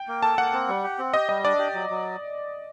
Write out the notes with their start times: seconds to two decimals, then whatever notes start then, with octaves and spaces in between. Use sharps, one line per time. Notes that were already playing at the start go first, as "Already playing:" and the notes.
Already playing: G5
0.08 A#3
0.23 A4 A5
0.38 A#3 F#5
0.53 C4
0.68 G3
0.84 G4
0.99 C4
1.14 G4 D#5
1.29 G3 D#5
1.44 D4 D5
1.59 G4
1.74 F#3
1.90 F#3